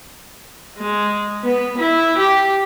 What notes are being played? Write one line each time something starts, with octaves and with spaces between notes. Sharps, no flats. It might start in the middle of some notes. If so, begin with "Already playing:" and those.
G#3
B3
E4
G4